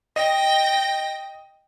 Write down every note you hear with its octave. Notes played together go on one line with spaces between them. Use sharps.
D#5 G5 A#6